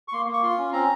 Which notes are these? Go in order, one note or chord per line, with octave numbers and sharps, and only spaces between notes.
C#6
A#3 C6
A#3
C#6
F4 C6
C#4
C4 A#5